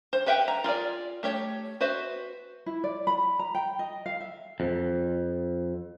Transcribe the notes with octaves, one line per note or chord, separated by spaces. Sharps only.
C5
G4 B4 E5 F#5 G5
A#5
F4 G#4 A#4 D5
A3 G4 C#5
F#4 B4 C5 E5
E4
D5
B5
A#5
G5
D#5
F5
E5
F2